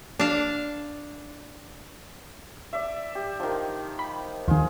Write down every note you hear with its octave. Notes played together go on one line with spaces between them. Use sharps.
D4 F5
D5 E5
G4
D#3 F3
B5
D#2 D#3 F4 G#4